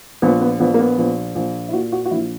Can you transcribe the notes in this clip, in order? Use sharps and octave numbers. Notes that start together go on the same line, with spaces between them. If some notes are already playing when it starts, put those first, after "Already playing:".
A#1 B3
B3
A#1 B3
A#3
B3
A#1
A#1
E4
A#2 F#4
F#4
F#4
A#1 E4